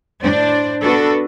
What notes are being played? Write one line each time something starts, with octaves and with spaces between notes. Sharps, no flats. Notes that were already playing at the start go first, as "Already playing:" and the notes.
A2 D4 C5 D5
B3 D4 F#4 A4 B4